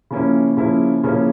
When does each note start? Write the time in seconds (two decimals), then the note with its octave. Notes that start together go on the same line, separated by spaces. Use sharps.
0.11 C#3 F3 A#3 C#4 E4
0.57 C#3 F3 A#3 C#4 E4
1.04 C#3 F3 A#3 C#4 E4